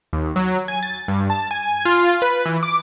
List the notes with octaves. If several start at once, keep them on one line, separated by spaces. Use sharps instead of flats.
D#2
F#3
G#5
A6
G2
A5
G#5
F4
B4
E3
D6